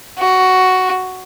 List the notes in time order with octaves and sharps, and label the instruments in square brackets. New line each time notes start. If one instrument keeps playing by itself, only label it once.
[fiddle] F#4